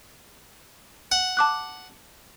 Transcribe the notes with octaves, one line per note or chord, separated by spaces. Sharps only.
F#5
A5 D6 F#6